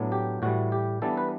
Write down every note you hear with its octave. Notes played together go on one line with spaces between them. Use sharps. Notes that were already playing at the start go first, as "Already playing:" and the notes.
Already playing: A2 F#3 B3 D4
G4
A2 E3 G3 F#4
G4
E3 G3 B3 D4 A4
B4